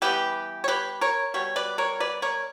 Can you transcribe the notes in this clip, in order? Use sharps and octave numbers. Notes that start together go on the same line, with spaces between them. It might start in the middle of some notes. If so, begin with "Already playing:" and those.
E3 G3 B3 G4 B4
C#5
G4 B4
A#4 C#5
B2 G3 C#5
B4 D5
A#4 C#5
B4 D5
A#4 C#5